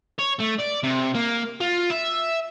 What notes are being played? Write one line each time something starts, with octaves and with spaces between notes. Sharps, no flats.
C#5
A3
D5
C3
A#3
F4
E5